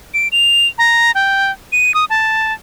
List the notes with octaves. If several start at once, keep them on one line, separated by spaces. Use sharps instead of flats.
D7
F7
A#5
G5
D#7
D#6
A5